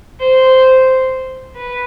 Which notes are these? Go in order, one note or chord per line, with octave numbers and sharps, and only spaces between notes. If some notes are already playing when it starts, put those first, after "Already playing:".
C5
B4